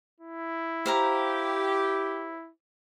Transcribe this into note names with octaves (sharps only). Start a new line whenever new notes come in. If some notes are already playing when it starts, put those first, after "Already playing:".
E4
G4 C5 F5 A#5